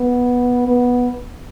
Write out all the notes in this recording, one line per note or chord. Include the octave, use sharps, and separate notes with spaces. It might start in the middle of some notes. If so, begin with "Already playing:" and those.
Already playing: B3
B3